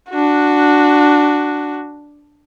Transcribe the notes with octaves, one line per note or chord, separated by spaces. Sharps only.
D4 F#4